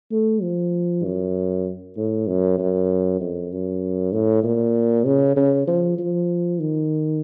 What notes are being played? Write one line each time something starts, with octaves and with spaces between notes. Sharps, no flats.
A3
F3
F#2
A2
F#2
F#2
F2
F#2
A2
A#2
C#3
C#3
F3
F3
D#3